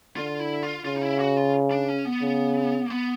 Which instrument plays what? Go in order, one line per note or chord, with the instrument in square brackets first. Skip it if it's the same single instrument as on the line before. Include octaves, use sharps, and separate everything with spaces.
[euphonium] D3 [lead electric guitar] F4
[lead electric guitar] E4
F4
[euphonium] C#3 [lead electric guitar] F4
[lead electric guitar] D#4
E4
F#4
F4
D4
C#4
B3
[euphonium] C#3
[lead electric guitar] A#3
B3